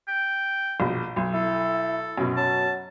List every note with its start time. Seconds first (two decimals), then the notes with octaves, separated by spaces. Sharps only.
0.08 G5
0.80 A#1 B2
1.16 B1
1.34 E4 A4
2.18 F#2 B2
2.37 F#3 A5